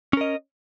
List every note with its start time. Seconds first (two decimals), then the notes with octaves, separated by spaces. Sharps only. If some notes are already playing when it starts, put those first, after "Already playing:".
0.13 C#4
0.17 A#4
0.21 D#5